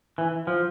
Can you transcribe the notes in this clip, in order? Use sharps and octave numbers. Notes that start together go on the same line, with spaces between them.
E3
F3